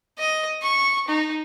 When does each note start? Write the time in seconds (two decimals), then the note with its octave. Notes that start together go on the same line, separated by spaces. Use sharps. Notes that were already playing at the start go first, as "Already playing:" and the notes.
0.18 D#5
0.62 C#6
1.08 D#4